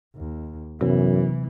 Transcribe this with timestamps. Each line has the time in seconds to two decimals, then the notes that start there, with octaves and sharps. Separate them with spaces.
0.16 D#2
0.81 F#2 C3 E3 F#3 B3